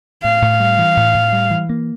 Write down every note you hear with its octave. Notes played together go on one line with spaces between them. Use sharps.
A2 F5
A2
G3
E3
A2
A2
G3
E3
A#3